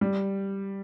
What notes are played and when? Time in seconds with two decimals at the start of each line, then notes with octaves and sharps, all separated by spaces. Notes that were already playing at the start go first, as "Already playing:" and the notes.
0.01 G3